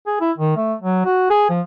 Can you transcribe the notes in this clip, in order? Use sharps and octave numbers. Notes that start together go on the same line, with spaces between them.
G#4
E4
D#3
A3
F#3
F#4
G#4
F3